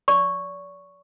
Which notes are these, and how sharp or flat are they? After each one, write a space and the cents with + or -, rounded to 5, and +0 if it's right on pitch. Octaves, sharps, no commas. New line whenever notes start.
D5 -40 C#6 +0